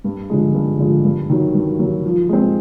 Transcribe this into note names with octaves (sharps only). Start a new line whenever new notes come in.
G2
D3 F3 G#3
G2
D3 F3 G#3
G2
D#3 F#3
G2
D#3 F#3
F3
G#3 C4